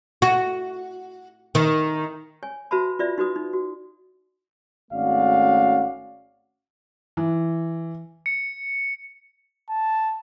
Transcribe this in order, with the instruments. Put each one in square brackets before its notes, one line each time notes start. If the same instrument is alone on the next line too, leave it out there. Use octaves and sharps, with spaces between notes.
[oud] F#4
D#3
[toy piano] C#5 G#5
F#4 B4 E5 A5 B5
F4 B4 D5 E5
D#4 F#4 B4 D#6
D#4
F#4
[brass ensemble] G#1 A3 C#4 F#4 D5 F5
[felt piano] E3
[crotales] C#7
[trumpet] A5